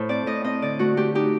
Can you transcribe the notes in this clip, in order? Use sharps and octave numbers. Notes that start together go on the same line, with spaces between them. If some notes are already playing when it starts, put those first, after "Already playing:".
Already playing: A2 A4 C5
C4 D5
A2 D#5
C4 D#5
D3 D5
A3 F#4
A3 G4
D#4 G4